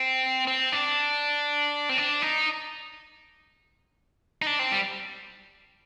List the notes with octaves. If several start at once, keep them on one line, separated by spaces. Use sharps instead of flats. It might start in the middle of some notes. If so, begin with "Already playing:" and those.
Already playing: C4
C4
D4
C4
D4
D#4
D#4
D4
C4
G3